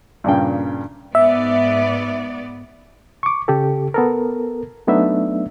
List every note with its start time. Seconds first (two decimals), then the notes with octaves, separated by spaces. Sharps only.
0.24 G2 A#2 C#3 G5
1.15 G#2 B3 D5 E5
3.23 C#6 D6
3.48 C#3 G4 A4
3.94 B3 A4 A#4
4.87 F#3 A3 B3 D4 D#4 E5